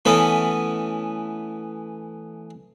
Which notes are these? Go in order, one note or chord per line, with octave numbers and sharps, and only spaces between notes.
E3 A3 B3 C#4 B5